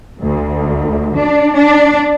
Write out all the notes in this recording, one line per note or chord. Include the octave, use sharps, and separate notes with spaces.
D2
D4
D4